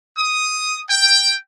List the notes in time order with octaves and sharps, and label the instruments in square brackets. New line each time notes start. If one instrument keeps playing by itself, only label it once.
[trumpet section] D#6
G5